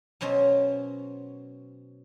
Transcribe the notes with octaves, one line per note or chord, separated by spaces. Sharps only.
B2 F#3 C#4 C5 C#5